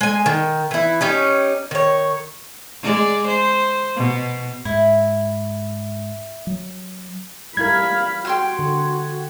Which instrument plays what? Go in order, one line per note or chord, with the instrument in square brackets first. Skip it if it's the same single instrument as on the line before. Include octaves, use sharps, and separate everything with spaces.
[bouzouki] G#3 G#5
D#3
E3 E4
C#4 D#4 G4
D#3 C#5
[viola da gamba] G#3 D5
C5
B2
[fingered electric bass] G#2 [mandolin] E4
[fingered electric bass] F#3
[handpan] G3 E4 A#4 [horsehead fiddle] F5 B5 [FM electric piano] G#6
[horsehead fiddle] F#4 [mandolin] G5 C6 F6
[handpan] D3